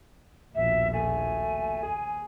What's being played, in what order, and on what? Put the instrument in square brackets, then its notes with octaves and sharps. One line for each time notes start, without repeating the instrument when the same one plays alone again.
[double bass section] A#1 D#2 B2 [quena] E5
[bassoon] A3 [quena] G#5
[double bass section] D#2 [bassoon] G#4